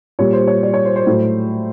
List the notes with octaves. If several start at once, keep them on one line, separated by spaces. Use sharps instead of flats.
A#2 G3 C#5
C5
C#5
D5
C#5
C5
C5
A2 F#3 C5